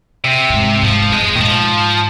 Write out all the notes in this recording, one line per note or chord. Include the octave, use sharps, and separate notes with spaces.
C3
A#2
G#2
G#2 F3
G#2
G#3
F2
A#2 D#3
G#2 F3